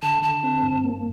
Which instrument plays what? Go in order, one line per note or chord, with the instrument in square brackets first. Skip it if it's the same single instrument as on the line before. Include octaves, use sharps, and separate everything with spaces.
[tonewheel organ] D3 [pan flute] A5
[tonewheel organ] D3 [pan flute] A5
[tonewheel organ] C4
G2
A#3